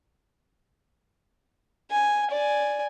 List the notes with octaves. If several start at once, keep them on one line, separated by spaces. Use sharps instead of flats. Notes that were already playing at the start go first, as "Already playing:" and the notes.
G#5
D5 G#5